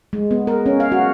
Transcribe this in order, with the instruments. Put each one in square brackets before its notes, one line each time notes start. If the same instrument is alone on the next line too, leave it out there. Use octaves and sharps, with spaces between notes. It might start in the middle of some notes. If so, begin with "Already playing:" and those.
[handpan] G#3
B3
A#4
C#4
F5
F#4